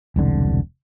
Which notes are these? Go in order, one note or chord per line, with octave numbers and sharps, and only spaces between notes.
E1 C2 D3